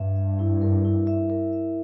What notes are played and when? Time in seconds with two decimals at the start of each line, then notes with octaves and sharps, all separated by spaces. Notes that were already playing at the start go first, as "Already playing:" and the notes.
Already playing: G2 E5
0.16 E5
0.39 E4
0.62 A#4
0.85 E4
1.07 E5
1.30 A#4
1.53 E5